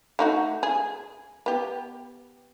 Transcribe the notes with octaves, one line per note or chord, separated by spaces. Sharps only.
A3 D#4 F#4
G#4
B3 G4